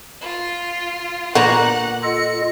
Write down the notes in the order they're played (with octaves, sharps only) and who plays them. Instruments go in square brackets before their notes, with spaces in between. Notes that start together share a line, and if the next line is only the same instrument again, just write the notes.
[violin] F4
[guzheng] A#2 F#4 A#5 [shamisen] D3 B3 [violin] F#5 F#6
[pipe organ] F4 A4 D#5 [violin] C#7